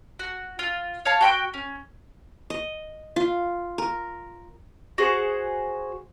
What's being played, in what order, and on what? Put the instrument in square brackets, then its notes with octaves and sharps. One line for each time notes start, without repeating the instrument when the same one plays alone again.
[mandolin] F#4
F4
C#5 F5 A5
F#4 G5 B5 F#6
C#4
[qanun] D#5
F4
A#4
[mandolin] F#4 G#4 C5 F#5